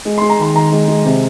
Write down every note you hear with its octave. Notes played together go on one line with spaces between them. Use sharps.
G#3
G#3 C6
A#5
D#3 C6
D#3 A#5
G#3
G#3
C3